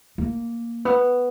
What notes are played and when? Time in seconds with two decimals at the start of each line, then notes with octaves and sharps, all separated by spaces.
0.18 A#3
0.85 B3